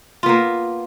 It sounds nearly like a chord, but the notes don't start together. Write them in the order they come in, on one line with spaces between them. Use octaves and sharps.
F4 B3 A#3